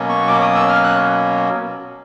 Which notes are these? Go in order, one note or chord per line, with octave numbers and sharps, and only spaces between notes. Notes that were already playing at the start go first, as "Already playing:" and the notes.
Already playing: B2 F#3 A#3 C#4
C#6
D6
D#6
E6
F6
F#6